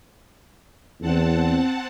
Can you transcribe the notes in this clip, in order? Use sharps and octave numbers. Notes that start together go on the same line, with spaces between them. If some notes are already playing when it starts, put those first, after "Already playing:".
E2 C4 F#5 A5